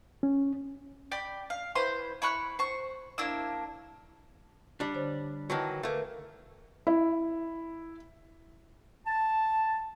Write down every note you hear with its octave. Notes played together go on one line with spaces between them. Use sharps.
C#4
D5 G5 B5
F5
E4 B4 C5 C6
E4 B5 C#6 F#6
C5 C#6
A#3 D4 E4 E6
G3 D4
D3 C5 C#5
D#3 E3 F#3 A5
A3 A#3 A#4 B4 E5
E4
A5